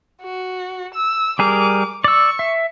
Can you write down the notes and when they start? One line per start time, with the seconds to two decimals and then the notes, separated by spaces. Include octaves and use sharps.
0.22 F#4
0.94 E6
1.39 G3 G#4 A#4 D6
2.04 D5 C#6 E6
2.39 E5